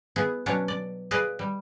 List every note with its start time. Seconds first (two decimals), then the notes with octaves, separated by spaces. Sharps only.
0.16 B3 E4 G#4
0.46 B2 F#3 C#4 D4 C#5
0.68 D5
1.11 G#4 B4 D5 D#5 F5
1.39 G3